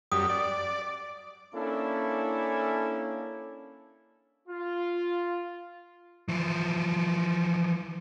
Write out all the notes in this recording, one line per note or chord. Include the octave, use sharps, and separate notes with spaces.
F#2 G3 D#6
D5
A#3 C#4 D4 E4 A4
F4
E3 F3